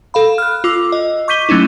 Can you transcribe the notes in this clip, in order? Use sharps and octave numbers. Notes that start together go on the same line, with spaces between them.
A4 F5 B5
F6 F#6
F4 D6 E6
D#5
C#6 D6 G6 B6 D#7 G7
F#3 A3 C#4 D#4 E4